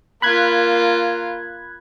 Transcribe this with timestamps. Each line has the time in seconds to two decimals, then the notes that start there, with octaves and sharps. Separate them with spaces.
0.22 A#3 F4 B5 F#6 G#6